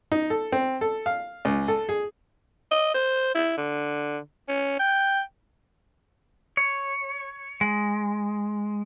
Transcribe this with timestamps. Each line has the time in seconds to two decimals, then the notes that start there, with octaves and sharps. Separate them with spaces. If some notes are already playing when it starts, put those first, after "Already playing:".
0.12 D#4
0.30 A4
0.52 C4
0.81 A4
1.06 F5
1.45 C#2
1.68 A4
1.89 G#4
2.71 D#5
2.94 C5
3.35 E4
3.57 D3
4.48 C#4
4.79 G5
6.57 C#5
7.61 G#3